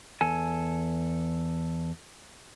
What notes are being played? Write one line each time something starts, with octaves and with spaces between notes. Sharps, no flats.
E2 A4 G#5